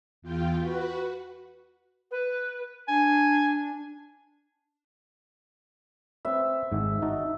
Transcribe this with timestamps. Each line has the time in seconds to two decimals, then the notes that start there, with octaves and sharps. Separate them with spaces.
0.22 E2 F4 G5
0.60 F#4 B4
2.11 B4
2.88 D4 G#5
6.25 C4 B4 E5
6.72 G#1 G#2
7.02 D#4 F#4 A5